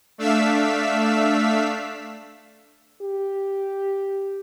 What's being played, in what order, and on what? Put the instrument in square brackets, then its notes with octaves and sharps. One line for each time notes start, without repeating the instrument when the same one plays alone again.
[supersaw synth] A3 D4 E5 F5 E6 B6
[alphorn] G4